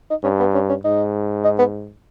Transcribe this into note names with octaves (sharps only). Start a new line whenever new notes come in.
D#4
G2 C#4
B3
C#4
C#4
G#2 D#4
D#4
B3